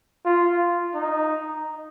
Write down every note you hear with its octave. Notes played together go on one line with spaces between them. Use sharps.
F4
D#4